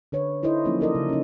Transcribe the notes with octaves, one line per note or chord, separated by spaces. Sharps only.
D3 B4 C#5
D#4 E4 A4 C5 D#5
F3 F#3 A#3 C#4 D#4 F4
D#4 A4 A#4 D5 D#5
C#3
C#4 D#4